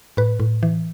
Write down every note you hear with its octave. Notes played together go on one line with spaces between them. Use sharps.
A2 B4
A2
E3